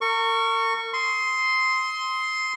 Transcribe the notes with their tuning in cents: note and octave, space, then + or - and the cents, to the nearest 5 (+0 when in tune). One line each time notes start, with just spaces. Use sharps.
A#4 -40 C#6 +0
C6 +0 D#6 +30